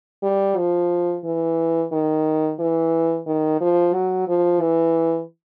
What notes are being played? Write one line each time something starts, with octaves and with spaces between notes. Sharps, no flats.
G3
F3
E3
D#3
E3
D#3
F3
F#3
F3
E3